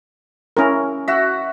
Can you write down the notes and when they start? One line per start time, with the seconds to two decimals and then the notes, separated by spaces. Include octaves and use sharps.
0.57 C#4 E4 A#4
1.08 F#4 E5